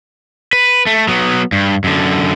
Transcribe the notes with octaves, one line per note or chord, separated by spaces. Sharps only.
B4
A3
F#3 B3
G2
F#2 D3